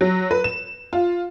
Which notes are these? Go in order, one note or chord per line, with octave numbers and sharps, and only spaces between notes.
F#3
B4
E7
F4